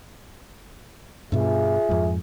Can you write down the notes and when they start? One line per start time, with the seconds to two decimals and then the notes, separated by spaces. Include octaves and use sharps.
1.32 G2 B2 F4 G#4 E5
1.89 F2 G#2